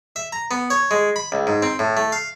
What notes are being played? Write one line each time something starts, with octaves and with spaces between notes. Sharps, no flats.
E5
A#5
B3
C#5
G#3
B5
C#2
G#2
C4
A2
A3
F5